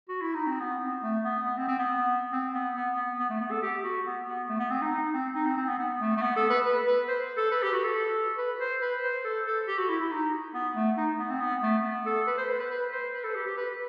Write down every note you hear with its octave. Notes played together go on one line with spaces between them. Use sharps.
F#4
E4
D#4
C4
B3
C4
A3
B3
B3
C4
C4
B3
C4
B3
B3
B3
B3
A3
B3
A4
G4
F#4
B3
B3
A3
B3
C4
D#4
D#4
C4
D#4
C4
C4
B3
B3
A3
A3
B3
A4
B4
B4
B4
C5
A4
B4
G4
F#4
A4
B4
C5
B4
C5
A4
A4
G4
F#4
E4
E4
D#4
B3
A3
D#4
B3
C4
B3
A3
B3
A4
B4
C5
B4
B4
B4
C5
B4
A4
G4
G4
B4